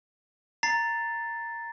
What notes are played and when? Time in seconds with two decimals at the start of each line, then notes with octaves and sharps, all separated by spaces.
0.63 A#5 A6 C7